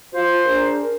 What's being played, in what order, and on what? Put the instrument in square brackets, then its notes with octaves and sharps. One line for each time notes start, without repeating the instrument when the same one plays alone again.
[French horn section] F4 [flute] C5
[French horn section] D4 G#4 A#4